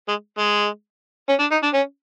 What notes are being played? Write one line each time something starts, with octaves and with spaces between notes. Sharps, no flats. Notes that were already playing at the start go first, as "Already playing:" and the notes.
G#3
G#3
C#4
D4
D#4
D4
C#4